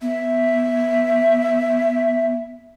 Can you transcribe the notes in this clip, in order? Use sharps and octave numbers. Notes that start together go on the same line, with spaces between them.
B3 E5